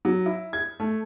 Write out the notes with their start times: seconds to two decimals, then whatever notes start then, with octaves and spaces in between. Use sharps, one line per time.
0.05 F#3
0.26 E4
0.53 G#6
0.80 A3